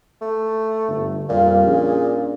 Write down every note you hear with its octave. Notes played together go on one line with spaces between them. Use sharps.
A3
G1
F2 A#2 G3 F5
C#4 D4 G#4